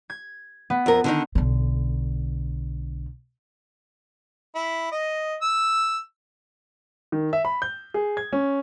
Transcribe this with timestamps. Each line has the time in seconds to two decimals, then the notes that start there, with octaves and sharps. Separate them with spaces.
0.10 G#6
0.70 B3
0.86 F2 A#4
1.04 D3 D#3 D#4
1.35 B1 D3
4.55 E4
4.91 D#5
5.42 E6
7.12 D#3
7.33 E5
7.45 B5
7.62 G6
7.94 G#4
8.17 G#6
8.33 C#4